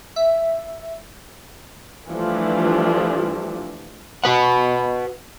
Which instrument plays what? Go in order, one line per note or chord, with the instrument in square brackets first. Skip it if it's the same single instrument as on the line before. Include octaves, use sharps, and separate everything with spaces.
[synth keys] E5
[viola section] E3 F3 G3 A3 D4
[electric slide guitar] F#4 B4 F#5